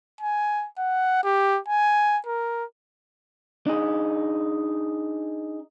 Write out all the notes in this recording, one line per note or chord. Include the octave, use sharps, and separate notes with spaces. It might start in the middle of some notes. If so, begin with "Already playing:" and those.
G#5
F#5
G4
G#5
A#4
D4 D#4 G#4